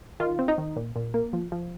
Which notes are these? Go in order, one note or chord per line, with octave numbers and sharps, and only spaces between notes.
D#3 F4
C4
D#4
D#3
A#2
A#2
A#3
F3
F3